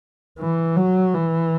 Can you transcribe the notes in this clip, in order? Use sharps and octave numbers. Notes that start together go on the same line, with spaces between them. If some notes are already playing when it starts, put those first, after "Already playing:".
E3
F#3
E3